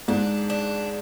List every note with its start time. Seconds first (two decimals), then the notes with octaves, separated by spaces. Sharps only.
0.08 G#2 D4
0.50 D4